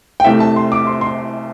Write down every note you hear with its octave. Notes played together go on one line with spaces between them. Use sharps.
G5
C2 C3 A3 E5
A5
C6
D6
C6
C6